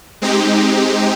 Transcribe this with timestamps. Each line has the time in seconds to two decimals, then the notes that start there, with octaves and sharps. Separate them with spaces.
0.22 G#3 C4 D#4 G4